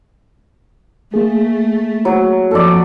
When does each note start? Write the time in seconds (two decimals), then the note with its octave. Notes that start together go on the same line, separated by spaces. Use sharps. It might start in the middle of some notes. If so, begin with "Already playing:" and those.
1.14 A3 A#3 G#4
2.05 F#3
2.51 F2 A4 D5